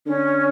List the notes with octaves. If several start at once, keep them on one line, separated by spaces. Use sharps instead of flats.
D3 C#4